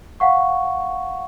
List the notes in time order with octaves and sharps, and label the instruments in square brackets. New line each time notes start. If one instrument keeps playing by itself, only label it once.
[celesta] F5 F#5 C#6